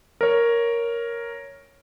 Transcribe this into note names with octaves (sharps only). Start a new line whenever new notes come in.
A#4 C#5